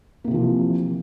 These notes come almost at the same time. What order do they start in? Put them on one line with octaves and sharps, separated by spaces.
A#3 C3 E3 F3